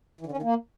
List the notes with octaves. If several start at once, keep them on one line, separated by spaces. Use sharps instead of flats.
E3
D3
C#4
D#3
A#3